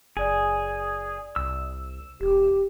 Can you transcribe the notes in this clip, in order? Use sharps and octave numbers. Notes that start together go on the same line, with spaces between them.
F#1 G#4 D5 D#6
C2 E6
E1 G4